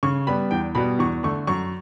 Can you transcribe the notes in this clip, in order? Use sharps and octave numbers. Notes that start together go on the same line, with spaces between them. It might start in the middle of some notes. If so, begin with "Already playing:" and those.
C#3 C#6
G3 B3 B5
E2 G5
B2 G3 B3 B5
E2 C#6
D3 A3 C#6
F#2 C#6